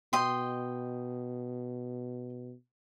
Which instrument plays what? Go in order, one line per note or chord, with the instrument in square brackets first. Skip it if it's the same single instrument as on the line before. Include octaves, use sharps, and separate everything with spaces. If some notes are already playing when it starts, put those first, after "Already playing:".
[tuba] B2 [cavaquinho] D#5 G5 C6